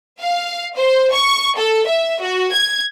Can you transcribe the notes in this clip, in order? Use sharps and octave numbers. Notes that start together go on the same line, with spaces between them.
F5
C5
C#6
A4
E5
F#4
G#6